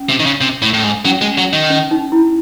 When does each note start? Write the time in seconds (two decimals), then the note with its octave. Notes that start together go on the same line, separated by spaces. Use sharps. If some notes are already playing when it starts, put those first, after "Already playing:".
Already playing: C#4
0.09 C3
0.19 D#3
0.26 C#3
0.41 C3
0.62 A2
0.74 A2
0.84 G#2
1.05 F#3 C#4
1.21 G#3
1.38 F#3
1.53 D#3
1.70 C#4
1.91 D#4
2.12 E4